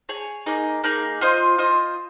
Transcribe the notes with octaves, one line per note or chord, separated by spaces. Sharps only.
G#4 C#5 G#5
A#3 D#4 G#4
A#3 D#4 G#4
F4 C5 D#5
F4 C5 D#5